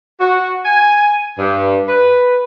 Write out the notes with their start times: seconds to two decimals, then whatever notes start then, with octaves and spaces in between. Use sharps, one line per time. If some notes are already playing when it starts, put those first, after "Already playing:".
0.20 F#4
0.65 G#5
1.39 G2
1.87 B4